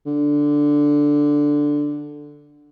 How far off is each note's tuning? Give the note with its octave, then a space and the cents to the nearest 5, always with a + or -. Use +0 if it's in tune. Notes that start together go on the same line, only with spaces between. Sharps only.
D3 +0